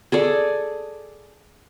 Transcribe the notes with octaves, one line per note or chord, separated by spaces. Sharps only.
G#4 A4 D5